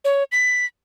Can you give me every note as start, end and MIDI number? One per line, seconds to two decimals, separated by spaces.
0.05 0.24 73
0.32 0.65 95